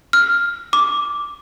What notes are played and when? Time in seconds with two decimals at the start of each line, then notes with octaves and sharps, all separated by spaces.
0.13 F6
0.73 D6